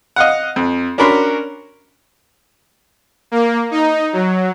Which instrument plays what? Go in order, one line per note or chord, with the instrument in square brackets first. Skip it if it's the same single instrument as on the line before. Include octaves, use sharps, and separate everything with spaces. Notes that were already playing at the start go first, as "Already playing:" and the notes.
[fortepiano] D#5 F5 F#5
F2
C#4 D4 F#4 A#4 B5 C6
[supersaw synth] A#3
D#4
F#3